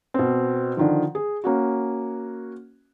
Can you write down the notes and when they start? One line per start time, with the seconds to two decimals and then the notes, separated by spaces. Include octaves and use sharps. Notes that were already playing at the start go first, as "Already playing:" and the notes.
0.14 B2 C4
0.77 D3 D#3 F3
1.15 G#4
1.44 A#3 C#4 F#4